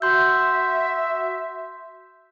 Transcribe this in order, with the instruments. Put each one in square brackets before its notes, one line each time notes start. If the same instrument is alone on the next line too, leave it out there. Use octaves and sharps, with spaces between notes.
[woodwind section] F#4 E5 [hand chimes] C6 G6